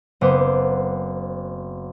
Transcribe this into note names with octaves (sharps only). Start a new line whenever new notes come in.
F#1 B3 C4 C5 D6